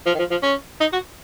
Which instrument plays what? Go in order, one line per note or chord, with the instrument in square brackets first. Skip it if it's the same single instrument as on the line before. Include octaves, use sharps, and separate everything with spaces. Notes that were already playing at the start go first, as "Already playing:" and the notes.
[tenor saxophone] F3
D#3
F3
F3
C#4
D#4
F#4